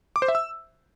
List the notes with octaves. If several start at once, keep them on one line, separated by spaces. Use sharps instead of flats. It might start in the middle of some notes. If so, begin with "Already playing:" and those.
D6
C5
E5
E6